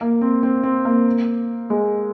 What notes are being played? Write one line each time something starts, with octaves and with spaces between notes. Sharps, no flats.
A#3
C4
C4
C4
A#3
G#3